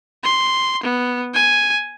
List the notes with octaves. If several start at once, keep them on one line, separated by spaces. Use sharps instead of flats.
C6
B3
G#5